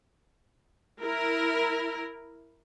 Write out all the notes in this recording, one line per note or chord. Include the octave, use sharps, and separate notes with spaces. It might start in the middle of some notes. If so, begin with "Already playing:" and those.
E4 A#4